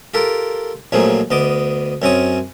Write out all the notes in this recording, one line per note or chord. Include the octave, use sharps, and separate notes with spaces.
F4 G4 A4 A#4
A#1 F3 F#3 A3 A#3 G#4
D2 B3 D#5 D6
F#2 C4 C#4 C#5 D#6